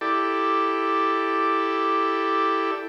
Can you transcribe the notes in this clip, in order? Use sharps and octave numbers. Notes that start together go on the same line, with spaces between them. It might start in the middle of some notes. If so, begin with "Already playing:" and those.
E4 G4 A4 D5